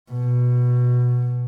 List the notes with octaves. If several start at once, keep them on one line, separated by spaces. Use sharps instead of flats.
B2